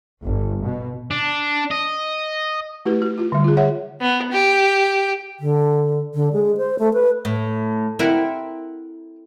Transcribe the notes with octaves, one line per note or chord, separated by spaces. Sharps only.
G1
B2
D4
D#5
A3 E4 F#4 G4 B4
F#4
F4 F#4
D3 G3
F4 G#4
C#5 E5 F#5
B3
G4
D3
D3
G#3
C5
A3
B4
A2
C4 E4 A#4 F#5